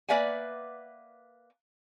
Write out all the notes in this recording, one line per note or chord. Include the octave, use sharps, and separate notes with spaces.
A#3 B4 D5 E5 F#5 G#5